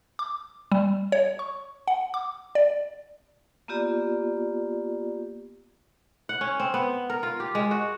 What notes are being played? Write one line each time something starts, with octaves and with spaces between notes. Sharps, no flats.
D6
G3
C#5
C#6
F#5
D6
D5
A#3 B3 F4 G4 D5
F#5
C#4
C4
B3
A#4
F4
G4
G#3
F#4